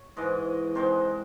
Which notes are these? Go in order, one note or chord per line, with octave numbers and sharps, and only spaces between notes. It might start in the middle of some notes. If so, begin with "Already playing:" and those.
Already playing: C#5
G#2 E3 G#3 D#5
C3 D#3 G#3 C5